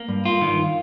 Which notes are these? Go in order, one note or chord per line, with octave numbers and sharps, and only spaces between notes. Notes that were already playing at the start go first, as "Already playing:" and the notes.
Already playing: A#3
G2
F4
D#3